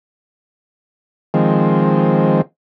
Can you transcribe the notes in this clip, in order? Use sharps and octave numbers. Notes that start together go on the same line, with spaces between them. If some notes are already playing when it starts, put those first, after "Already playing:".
D#3 F3 G#3 C4